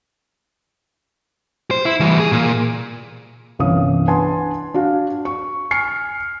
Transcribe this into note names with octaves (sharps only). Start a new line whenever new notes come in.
C5
E4
E3 G3
G#4
A#2
G1 C2 E3 C#4 F5 D#6
D4 B4 F#5 G#5 A5 C6
D4 F#4 F5
C#6
G#5 F6 C7 C#7